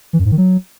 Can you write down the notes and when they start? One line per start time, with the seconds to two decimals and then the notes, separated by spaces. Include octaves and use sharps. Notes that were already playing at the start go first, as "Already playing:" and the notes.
0.13 E3
0.19 F#2
0.25 G#2
0.32 D#3
0.38 F#3